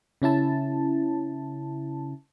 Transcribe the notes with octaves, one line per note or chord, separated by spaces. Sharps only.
C#3 C#4 E4 A5